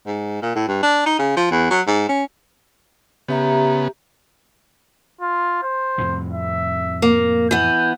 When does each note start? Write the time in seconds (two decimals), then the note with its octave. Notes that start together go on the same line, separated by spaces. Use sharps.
0.07 G#2
0.42 A#2
0.55 A2
0.68 G2
0.83 D4
1.06 D#4
1.19 C#3
1.36 F3
1.51 E2
1.70 F#3
1.87 G#2
2.09 C#4
3.28 C#3 B3 G4 E5 A#5
5.21 F4
5.62 C5
5.98 F2 A2 C3
6.33 E5
7.02 A#3
7.51 E3 B3 G6